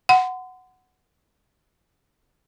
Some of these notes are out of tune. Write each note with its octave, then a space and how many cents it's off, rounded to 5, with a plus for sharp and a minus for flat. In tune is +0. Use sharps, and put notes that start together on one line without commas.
F#5 +0 C6 -35